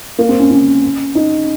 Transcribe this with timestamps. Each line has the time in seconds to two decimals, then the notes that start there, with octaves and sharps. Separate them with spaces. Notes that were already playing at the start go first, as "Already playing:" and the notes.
0.19 A#3
0.29 C4
0.40 C#4
0.51 C#4
1.15 D#4